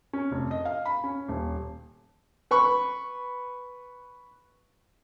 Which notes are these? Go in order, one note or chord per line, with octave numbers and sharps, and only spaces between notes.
C#4
F1
D#5
F5
B5
C#4
D#1
B4 B5 C#6